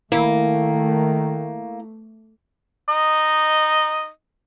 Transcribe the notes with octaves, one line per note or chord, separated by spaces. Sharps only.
D#3 A3 A#3 E4
D#4 D#5